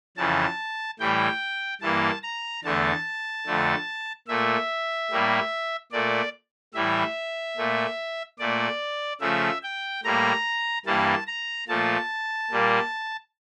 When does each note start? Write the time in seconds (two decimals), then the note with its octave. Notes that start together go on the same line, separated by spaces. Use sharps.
0.17 F2 C#3 E3 A5
0.99 A2 E3 G3 G5
1.81 G2 E3 A#3 A5
2.23 A#5
2.64 E2 D3 A3 A5
3.46 F2 D3 A3
4.28 A#2 A3 E5
5.11 A2 G3 A#3
5.92 A#2 A3 D5
6.74 A2 E3 G3 E5
7.57 A#2 A3
8.39 A#2 A3 D5
9.21 C#3 F3 A3 E5
9.63 G5
10.03 A2 G3 A#3 A#5
10.86 G2 E3 G3 A#3 A5
11.27 A#5
11.68 A#2 F3 A3 A5
12.51 A#2 G3 A#3